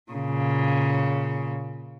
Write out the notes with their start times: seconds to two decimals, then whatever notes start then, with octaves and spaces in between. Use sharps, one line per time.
0.12 A#2 C#3